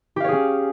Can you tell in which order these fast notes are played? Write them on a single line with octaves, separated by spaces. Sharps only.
G4 F5 C#5 G#4 C#4